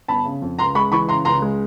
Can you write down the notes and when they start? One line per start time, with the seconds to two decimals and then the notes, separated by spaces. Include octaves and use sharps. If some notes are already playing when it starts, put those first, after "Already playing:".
0.08 G1 A5 B5
0.25 C#3
0.42 F2
0.59 C#2 A#5 C6
0.75 G#3 B5 C#6
0.92 E3 B5 C#6
1.09 C#3 A#5 C6
1.25 C#2 A#5 C6
1.42 G#3